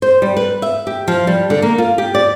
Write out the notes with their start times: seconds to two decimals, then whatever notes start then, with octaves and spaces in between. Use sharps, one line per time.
0.02 C5
0.22 G3
0.37 B4
0.62 E5
0.87 G4
1.08 F3
1.27 G3
1.50 D3
1.62 A#3
1.78 F4
1.98 G4
2.15 D5